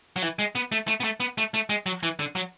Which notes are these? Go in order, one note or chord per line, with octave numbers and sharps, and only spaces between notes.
F#3
E3
G#3
B3
A3
A3
B3
A3
B3
A3
A3
G#3
F#3
E3
D3
F#3